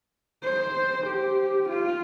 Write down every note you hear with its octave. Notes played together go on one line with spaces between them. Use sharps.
C5
G4
F4